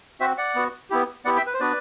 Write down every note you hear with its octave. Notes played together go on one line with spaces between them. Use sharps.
C4 F#4 C5 E5
D5 F#5
B3 F#4
B3 E4 G4
B3 E4 G4 D5 F#5
E5 G5
B4
C5
B3 D4 F#4 B4 D5